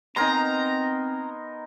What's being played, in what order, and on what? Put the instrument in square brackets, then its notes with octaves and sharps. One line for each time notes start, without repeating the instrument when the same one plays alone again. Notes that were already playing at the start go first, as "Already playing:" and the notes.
[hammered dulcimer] B3 D#4 [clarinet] C4 [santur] A#4 G#5 C6 [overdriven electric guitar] A#5